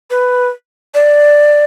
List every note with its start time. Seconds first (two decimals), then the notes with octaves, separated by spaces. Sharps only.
0.10 B4
0.94 D5